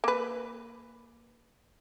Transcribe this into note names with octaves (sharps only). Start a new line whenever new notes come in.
A#3 B4